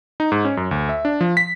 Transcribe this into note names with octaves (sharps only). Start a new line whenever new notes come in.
D#4
G#2
C#4
F#2
D2
E5
D4
F3
B6